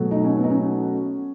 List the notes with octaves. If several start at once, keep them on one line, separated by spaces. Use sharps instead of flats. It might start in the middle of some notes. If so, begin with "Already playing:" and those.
Already playing: B2 F#3 A3
D#4
C#4
B3
D#4
C#4